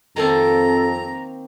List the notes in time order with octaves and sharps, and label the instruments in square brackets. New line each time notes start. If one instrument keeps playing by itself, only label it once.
[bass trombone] F2 [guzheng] D#3 A#3 C4 [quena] A4 [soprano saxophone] A#5